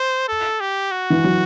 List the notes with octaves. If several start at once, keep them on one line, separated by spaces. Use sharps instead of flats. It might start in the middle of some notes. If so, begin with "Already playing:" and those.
Already playing: C5
A4
G4
F#4
E3
F#3